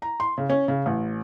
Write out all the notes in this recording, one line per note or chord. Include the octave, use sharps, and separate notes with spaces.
A#5
C6
C#3
C#4
C#3
A1